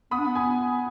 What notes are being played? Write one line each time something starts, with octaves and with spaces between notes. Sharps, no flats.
B3 B5 D#6
D4
B3
G#5 B5